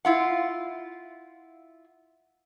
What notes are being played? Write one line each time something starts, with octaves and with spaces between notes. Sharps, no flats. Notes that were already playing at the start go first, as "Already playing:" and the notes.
E4 F4 F#5